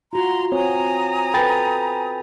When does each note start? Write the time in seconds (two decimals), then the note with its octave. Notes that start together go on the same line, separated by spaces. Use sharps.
0.13 F4 F#4 A#5 C6
0.52 C4 C#5 G#5 A#5 D#6
1.34 A4 B4 G5 B5 A6